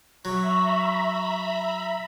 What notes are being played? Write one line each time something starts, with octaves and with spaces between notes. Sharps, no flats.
F#3 E5 A#5 B5 C#6